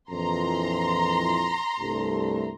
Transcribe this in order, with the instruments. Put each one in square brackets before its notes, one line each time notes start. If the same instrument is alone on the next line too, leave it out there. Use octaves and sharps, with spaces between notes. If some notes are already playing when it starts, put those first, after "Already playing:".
[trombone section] A#1 F2 E3 [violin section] A#5 C6
[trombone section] C2 G2 A3